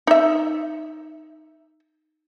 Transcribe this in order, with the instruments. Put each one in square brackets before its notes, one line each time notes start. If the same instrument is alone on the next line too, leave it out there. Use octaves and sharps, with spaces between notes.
[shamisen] D#4 E5